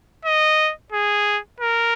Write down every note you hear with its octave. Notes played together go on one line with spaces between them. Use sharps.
D#5
G#4
A#4